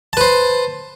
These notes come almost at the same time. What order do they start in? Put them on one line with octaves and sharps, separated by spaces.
A5 B4 C5